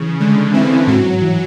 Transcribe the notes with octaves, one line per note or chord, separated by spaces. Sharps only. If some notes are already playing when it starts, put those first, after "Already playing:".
Already playing: C#3 E3
D3 G#3
E3 C4
G#2 F#3
E3